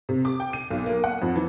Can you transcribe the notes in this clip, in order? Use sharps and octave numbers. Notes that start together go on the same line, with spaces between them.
C3
D6
G5
D#7
B1
A#3
F#5
F2
E3